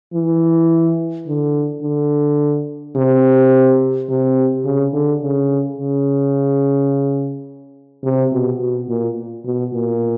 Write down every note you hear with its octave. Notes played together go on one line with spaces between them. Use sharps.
E3
D3
D3
C3
C3
C#3
D3
C#3
C#3
C3
B2
B2
A#2
B2
A#2